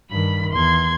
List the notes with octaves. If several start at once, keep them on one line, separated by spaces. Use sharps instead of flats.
G2 D#3 B5
E2 C6 G#6